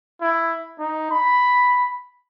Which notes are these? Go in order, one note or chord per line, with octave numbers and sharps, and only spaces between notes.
E4
D#4
B5